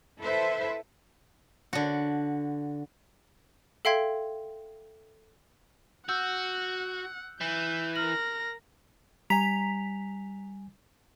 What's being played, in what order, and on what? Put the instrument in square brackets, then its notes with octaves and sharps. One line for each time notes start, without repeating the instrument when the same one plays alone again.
[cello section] E4 A4 B4 C5 E5
[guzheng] D3 F#4
[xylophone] A4 E5 F5 G5 C6 G#6
[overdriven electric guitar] F#4 [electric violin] F#5 [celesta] E6 G6
[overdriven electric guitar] E3 [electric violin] G6
[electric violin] A#4 A#6 [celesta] F6 F#7
[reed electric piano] G3 G#5 [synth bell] A#5 B6 F7